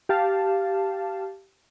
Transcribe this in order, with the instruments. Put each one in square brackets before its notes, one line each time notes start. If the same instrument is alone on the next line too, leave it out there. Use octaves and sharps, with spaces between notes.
[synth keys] G4 F5 A5